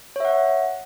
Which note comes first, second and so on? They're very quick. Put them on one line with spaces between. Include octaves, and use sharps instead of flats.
C#5 E5 F#5